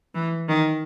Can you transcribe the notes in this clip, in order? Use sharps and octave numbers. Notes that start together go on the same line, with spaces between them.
E3
D#3